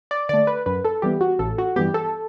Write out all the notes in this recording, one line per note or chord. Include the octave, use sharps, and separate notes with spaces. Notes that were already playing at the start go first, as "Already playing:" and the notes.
D5
D3 A3 D5
B4
F#2 B4
A4
E3 G3 B3 G4
F#4
A1 A4
F#4
G2 E3 B3 G4
A4